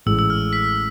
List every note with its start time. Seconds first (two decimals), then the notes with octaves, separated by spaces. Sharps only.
0.06 A1 A2 G#3 E6
0.19 E6
0.30 F6
0.53 B6